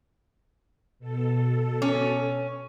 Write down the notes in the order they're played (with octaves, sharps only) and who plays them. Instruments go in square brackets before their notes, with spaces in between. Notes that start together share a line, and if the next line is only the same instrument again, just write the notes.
[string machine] B2 A4
[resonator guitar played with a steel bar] C#4